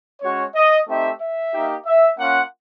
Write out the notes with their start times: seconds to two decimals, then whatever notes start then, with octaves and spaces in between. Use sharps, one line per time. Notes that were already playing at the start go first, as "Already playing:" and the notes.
0.22 G#3 C#4 F#4 C#5
0.54 D#5
0.87 A3 C4 D#4 G4 E5
1.20 E5
1.53 A#3 D#4 G4
1.86 E5
2.18 A#3 C#4 F4 F#5